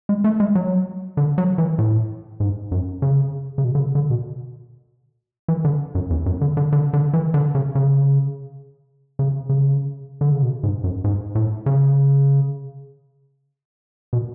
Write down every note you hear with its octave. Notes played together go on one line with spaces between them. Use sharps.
G#3
A3
G#3
F#3
D3
F#3
E3
A2
G#2
F#2
C#3
C#3
B2
D3
C#3
D3
B2
E3
D3
F#2
E2
F#2
D3
D3
D3
D3
E3
D3
C#3
C#3
C#3
C#3
D3
C#3
B2
G#2
F#2
G#2
A2
C#3
B2